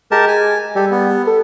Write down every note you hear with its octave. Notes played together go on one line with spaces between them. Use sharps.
G#3 G4 A#4 A5
G#5
G3 G4 A4
B3
A4